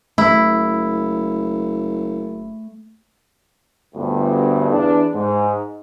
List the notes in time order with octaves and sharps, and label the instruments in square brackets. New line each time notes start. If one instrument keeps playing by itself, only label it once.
[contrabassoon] F#1 [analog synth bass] A3 [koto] E4
[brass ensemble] G1 D2 G2
E2 D4
G#2